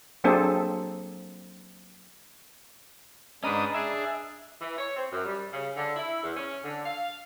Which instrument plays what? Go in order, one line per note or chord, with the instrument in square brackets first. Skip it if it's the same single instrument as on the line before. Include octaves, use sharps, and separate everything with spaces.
[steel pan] F#3 A#3 C4 D4 G#4 A4
[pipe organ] G#2 D4 D#6 [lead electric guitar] C#4 B4 [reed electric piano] D#5 A#5 B5
[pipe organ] D4 G#4 [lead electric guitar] E5
[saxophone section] E3
C#5
C4
F#2
G3
C#3
D3
E4
E2
C#4
D3
F5